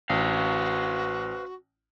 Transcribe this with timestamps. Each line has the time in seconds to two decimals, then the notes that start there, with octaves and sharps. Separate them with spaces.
0.10 A1 F#4 B4 C5 F5